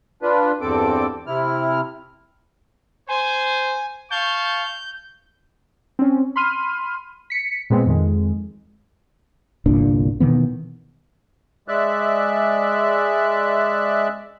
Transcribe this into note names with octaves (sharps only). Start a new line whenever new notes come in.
D4 F4 B4
E2 G2 C4 A4 D6
C3 E4 F6
C5 G#5
F5 A5 C#6 G6
C4 C#4
B5 C6 F6 D#7
B6 C#7
A#2 G#3 B3 C4
F2 D#3 G#3
G1 C2 A#2 D4
B2 D#3 E3 B3
G#3 D5 E5 F#6